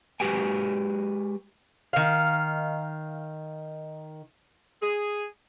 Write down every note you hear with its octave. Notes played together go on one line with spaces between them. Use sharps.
G#3 F#4 G4 B4 G5 G#5
D#3 F5
G#4